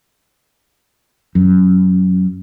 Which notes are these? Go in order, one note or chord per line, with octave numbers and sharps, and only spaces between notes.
F#2